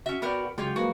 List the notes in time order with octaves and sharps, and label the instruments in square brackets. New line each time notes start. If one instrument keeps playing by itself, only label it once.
[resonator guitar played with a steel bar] C#4 E5 [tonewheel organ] F#4
[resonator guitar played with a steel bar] B3 A#4 B4 [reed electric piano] D5 G5 C#6
[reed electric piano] C#2 G5 [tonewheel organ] F#3 G#3 [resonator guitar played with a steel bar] F4 G4 C#5
[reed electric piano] F3 A#3 B4 [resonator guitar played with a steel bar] F#4